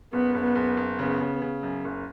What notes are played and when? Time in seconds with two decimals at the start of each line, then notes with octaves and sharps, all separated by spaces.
0.13 F#1 B3
0.35 F#1
0.42 B3
0.55 F#1
0.77 F#1
0.98 C#3 B3
1.20 C#3
1.42 C#3
1.63 F#2
1.85 F#1